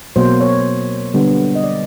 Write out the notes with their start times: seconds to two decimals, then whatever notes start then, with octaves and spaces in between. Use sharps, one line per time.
0.16 B2 F#3 A#3 C5
0.41 C#5
1.14 D3 G3 B3 D4
1.55 D#5
1.64 D5